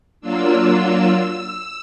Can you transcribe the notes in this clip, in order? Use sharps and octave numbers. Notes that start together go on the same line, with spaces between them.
F#3 A#3 D4 F4 E6